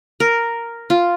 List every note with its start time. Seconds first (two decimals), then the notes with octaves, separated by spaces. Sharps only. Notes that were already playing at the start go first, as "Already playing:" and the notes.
0.20 A#4
0.90 F4